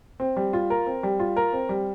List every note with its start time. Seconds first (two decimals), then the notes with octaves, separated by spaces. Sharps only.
0.20 C4
0.36 G3
0.53 F4
0.70 A#4
0.87 C4
1.03 G3
1.20 F4
1.37 A#4
1.53 C4
1.69 G3